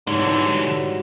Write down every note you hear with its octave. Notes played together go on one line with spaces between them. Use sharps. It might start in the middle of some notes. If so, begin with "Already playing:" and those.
G#2 D3 E3 F#3 G3